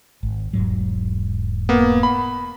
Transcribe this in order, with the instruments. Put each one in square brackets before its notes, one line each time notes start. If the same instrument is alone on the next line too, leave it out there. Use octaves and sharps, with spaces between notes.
[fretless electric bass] G#1
E1 G#2 F#3
[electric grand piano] A#3 B3
B5